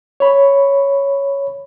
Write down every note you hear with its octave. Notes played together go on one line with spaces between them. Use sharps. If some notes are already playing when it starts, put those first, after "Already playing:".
C#5 B5